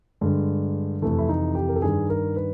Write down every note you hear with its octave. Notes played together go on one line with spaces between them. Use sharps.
G2 D3 G#3
F2 C3 E3 A3
E4
D#4
G4
A#4
A4
G2 D#3 G#4
A#4
B4